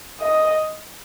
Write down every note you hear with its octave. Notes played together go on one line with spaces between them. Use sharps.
D#5